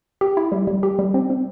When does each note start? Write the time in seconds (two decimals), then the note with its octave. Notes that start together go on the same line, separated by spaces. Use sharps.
0.21 G4
0.37 E4
0.52 G3
0.67 G3
0.83 G4
0.99 G3
1.14 C4
1.30 C4